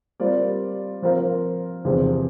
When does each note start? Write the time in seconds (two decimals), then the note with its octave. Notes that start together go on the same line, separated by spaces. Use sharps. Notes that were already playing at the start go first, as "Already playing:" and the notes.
0.20 G3 C4 F4 A#4 D5
1.02 F3 C4 F4 A#4 F5
1.85 E2 C3 F3 C4 G4